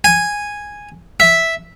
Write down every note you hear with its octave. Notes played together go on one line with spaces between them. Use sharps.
G#5
E5